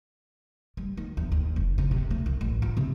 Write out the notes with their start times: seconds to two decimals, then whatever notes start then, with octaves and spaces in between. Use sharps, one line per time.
0.77 G3
0.97 D#3
1.17 E2
1.32 D#2
1.56 F1
1.78 C#3
1.91 C3
2.11 A3
2.26 C2
2.41 A1
2.62 F4
2.77 C3